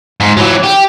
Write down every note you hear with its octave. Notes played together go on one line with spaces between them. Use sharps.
G#2
E3 F#3
G4